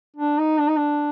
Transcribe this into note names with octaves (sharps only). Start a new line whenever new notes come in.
D4
D#4
D4
D#4
D4